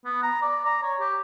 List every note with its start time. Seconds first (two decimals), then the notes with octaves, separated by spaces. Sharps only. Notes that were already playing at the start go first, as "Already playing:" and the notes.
0.05 B3
0.23 A#5
0.42 D5
0.65 A#5
0.82 C#5
1.00 G4